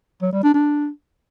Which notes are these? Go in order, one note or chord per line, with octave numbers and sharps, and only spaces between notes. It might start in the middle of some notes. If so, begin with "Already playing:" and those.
F#3
G3
D4
D4